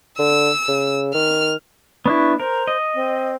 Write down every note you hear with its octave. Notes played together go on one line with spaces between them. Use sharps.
D3 E6
C#3
D#3 F6
B3 D4 E4 C#6
A#4 C5
D#5
C4